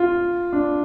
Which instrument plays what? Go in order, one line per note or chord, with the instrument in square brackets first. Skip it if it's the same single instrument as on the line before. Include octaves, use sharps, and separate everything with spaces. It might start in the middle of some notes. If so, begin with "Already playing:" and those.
Already playing: [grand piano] F4
D4